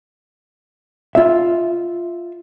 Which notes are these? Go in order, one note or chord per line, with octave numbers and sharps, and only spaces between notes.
F4 E5